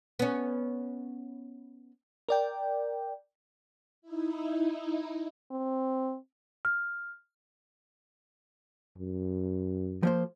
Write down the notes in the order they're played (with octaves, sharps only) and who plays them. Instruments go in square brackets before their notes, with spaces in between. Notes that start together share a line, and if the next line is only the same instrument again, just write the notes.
[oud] B3 C#4
[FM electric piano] A#4 D5 G5
[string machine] D#4 E4
[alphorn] C4
[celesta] F6
[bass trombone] F#2
[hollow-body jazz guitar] F3 A#3 C5